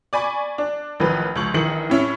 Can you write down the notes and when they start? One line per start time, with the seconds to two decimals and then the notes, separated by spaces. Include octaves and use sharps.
0.13 D5 G#5 B5 C#6
0.58 D4
1.00 A1 D#3 F3 B4
1.36 C#2 F3 C#6 F#7
1.54 A#1 D#3 E3 C#7 F#7
1.90 A2 C#4 E4